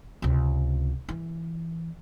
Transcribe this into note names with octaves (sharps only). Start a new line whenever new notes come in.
C#2 C3
E3